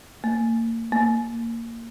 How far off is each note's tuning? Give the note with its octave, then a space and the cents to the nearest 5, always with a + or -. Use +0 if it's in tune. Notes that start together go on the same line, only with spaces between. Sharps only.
A#3 -35
A#3 -15